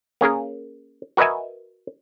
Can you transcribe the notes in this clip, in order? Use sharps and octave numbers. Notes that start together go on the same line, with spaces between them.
A#3 C#4 G#4 A#4
F#4 A#4 B4 D#5 E5 G#5